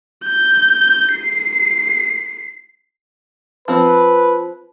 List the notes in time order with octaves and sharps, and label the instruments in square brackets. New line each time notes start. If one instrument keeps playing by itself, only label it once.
[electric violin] G6
C7
[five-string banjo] F3 C4 [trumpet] B4